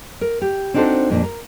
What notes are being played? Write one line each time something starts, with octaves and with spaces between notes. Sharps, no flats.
A#4
G4
C4 D4 D#4 F#4 A4 C5
F2 A#2 D4
A#4